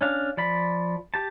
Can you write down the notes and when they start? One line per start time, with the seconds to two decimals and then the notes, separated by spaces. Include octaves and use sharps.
0.01 C#4 D4 F5
0.37 F3 D5 B5
1.14 G4 A5